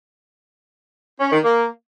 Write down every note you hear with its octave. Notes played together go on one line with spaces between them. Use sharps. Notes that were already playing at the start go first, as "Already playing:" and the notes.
C#4
D#3
A#3